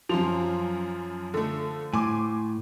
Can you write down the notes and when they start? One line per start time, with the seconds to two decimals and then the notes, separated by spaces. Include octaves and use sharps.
0.09 F#2 F3 C6 F7
1.34 D3 A3
1.93 A2 G#5 C6 D6